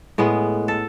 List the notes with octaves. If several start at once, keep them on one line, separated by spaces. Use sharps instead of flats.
A2 G#3 B3
A4